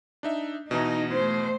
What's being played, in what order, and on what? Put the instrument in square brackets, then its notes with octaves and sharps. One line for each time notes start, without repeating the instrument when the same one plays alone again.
[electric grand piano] D4 D#4 E5
[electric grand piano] B2 E3 [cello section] D#4
[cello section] A3 C5